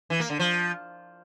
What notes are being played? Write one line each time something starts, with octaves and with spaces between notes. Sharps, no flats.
E3
A#3
D3
F3